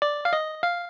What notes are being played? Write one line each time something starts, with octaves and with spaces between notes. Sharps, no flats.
D5
F5
D#5
F5